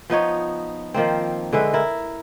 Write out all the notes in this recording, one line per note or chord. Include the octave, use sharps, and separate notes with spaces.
F3 B3 D#4 C#5
D#3 F3 A#3 C4
D3 G#3 B4 E5
E4 A#4